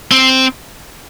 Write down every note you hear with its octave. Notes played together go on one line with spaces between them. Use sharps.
C4